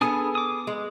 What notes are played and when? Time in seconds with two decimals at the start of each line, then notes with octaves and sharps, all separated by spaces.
0.01 B3 D4 G#4 A4 G#5 D#6
0.35 D6 D#6
0.67 G#3